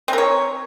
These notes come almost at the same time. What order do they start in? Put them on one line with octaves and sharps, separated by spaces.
C4 A#4 C#5